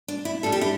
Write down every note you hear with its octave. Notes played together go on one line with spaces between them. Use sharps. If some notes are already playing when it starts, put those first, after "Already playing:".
D4
E4
A2 G3 D4 A4
G4
E4